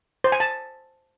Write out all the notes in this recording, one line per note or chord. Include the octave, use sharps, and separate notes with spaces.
C5
G#5
A5